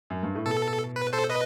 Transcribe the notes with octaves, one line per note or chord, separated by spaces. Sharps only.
F#2
G2
A2
B2 A4
B4
A4 C5
B4 D#5